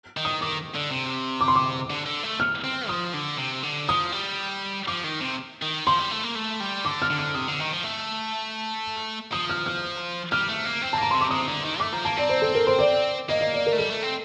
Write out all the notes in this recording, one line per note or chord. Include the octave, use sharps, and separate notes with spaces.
D#3
D#6
D#3 D6
D3
C3
D6
C6
D6
D3
D3
A3
F6
C4
F3 D#6
D3
C3
D3
F3 D#6
G3
F3 D6
D#3
C3
D#3
F3 C6
G3
A3
A#3
A3
G3
D3 D6
F6
D3
F6
C3 D#6
D3
D#3
F3
A3
F3 D#6
F6
F6
G3 F6
A3
A#3
C4
A5
A#3 A#5
C3 C6
D6
C3 D#6
D3
D#3
A3 D6
F3 A#5
A#3 A5
C4 D5
C5
A4
A#4
C5
D5
A#3 D#5
D#5
D5
A#4
A3
G3 A4
A3
C4